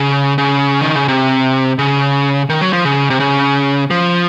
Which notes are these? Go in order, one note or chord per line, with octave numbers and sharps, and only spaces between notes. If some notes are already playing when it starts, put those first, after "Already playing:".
Already playing: C#3
C#3
D#3
C#3
C3
C#3
D#3
F#3
F3
C#3
C3
C#3
F3